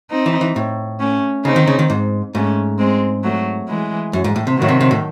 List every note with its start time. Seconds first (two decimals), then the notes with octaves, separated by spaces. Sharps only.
0.11 C4 D#4
0.26 E3
0.41 E3
0.56 A2
1.00 A3 C#4
1.45 C#3 C4 D#4
1.56 D#3
1.67 C#3
1.79 D#3
1.90 G#2
2.35 G#2 A3 C#4
2.79 G#3 C4
3.23 F#3 A3
3.68 E3 G#3
4.13 F#2
4.24 G#2
4.36 A2
4.47 C3
4.57 A2 D#3 F#3
4.68 C3
4.81 C3
4.91 A2